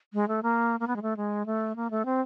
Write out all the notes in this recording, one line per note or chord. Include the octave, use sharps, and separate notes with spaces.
G#3
A3
A#3
A#3
B3
G#3
A3
G#3
A3
A#3
A3
C4